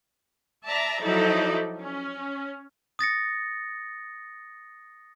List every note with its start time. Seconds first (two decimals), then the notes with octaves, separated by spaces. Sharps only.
0.65 D5 E5 A5 A#5
1.02 F3 F#3 D#4 E4 A4 D5
1.79 C#4
2.99 D#6 A6 A#6 C#7